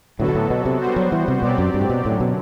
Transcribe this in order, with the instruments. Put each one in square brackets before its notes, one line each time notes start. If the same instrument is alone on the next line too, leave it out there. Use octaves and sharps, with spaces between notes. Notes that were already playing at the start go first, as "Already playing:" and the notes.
[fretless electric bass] A2 [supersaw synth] D3 F#3 B3 F#4 A4
[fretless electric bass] B2
A2
B2
C3
[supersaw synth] G3 B3 F#4 C5
[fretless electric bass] F#3
E3
C3
[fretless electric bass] B2 [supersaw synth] F#3 C4 G4 D5
[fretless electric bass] F#2
G2
A2
B2
[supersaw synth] F#2 D3 F#3 [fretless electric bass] A2
[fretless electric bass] B2